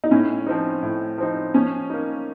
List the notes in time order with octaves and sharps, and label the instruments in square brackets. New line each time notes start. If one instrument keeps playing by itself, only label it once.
[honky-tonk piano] D#4
[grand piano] A2 [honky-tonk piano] C#4
[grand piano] F3 C4 D#4
A2
F3 C4 D#4
[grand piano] F3 [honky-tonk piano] C#4
[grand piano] A#3 D#4